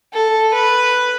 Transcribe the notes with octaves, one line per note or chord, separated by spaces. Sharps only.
A4
B4